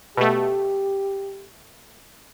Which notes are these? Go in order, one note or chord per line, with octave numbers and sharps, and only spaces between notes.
B2 A3 G4